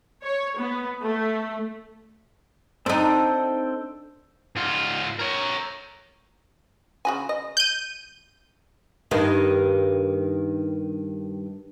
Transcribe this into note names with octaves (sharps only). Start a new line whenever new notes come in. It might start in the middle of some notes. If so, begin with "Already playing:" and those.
C#5
B3
A3
C4 D4 D#4 A4 G5
G#2 F4
A#4 C#5
C#3 F#4 G#5
D#5
G6 D#7
G2 D#3